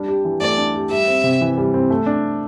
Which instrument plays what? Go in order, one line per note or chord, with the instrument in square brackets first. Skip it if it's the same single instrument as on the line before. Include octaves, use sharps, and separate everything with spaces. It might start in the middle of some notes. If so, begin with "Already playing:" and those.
Already playing: [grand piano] G3 D4
G4
E3
[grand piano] A3 [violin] D5
[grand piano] D4
G4
[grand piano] G3 [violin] E5
[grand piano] C4
C3
E3
G3
C4
A3
D4